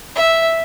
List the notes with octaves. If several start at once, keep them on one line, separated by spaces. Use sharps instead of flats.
E5